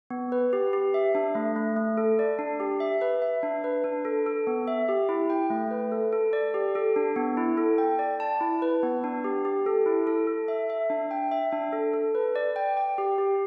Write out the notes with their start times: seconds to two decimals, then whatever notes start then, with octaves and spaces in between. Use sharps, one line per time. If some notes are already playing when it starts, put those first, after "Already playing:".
0.10 B3
0.32 B4
0.53 G4
0.73 G4
0.94 E5
1.15 D4
1.35 A3
1.56 A3
1.76 A3
1.97 A4
2.19 D5
2.39 D4
2.60 G4
2.80 E5
3.01 B4
3.22 E5
3.43 D4
3.64 B4
3.84 D4
4.05 A4
4.26 A4
4.47 B3
4.68 E5
4.89 G4
5.09 E4
5.30 G5
5.50 A3
5.71 B4
5.92 A4
6.12 A4
6.33 D5
6.54 G4
6.75 A4
6.96 D4
7.16 B3
7.37 E4
7.58 A4
7.78 G5
7.99 D5
8.20 A5
8.41 E4
8.62 B4
8.83 B3
9.04 D4
9.24 G4
9.45 G4
9.66 A4
9.86 E4
10.07 A4
10.27 A4
10.48 E5
10.70 E5
10.90 D4
11.11 G5
11.32 E5
11.52 D4
11.73 A4
11.94 A4
12.15 B4
12.36 D5
12.56 G5
12.77 G5
12.98 G4
13.18 G4